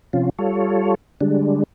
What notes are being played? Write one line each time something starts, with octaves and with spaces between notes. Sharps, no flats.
C3 F3 C#4 F4
G3 F4 A4 C#5
D3 G3 G#3 D4